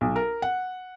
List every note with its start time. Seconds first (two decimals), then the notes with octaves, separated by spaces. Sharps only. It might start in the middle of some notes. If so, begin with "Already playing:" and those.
0.01 B1
0.16 A#4
0.42 F#5